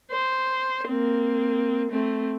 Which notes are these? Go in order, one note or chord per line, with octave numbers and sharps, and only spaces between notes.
C5
A#3 C4
A3 C4